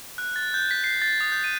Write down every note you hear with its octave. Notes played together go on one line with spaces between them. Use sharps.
F#6
A6
G6
B6
C7
A6
D#6
G6
D#7